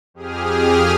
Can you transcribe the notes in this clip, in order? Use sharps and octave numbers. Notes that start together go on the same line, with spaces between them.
F2 G4 G#4 D#6 F6